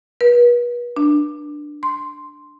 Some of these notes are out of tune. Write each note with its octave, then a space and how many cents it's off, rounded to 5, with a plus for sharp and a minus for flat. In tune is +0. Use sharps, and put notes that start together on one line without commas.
B4 -40
D4 +10
C6 +0